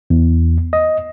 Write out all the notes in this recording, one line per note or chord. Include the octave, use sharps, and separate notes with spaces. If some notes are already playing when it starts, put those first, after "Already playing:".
E2
D#5